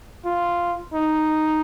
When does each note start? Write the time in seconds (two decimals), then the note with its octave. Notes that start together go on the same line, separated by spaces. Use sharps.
0.25 F4
0.93 D#4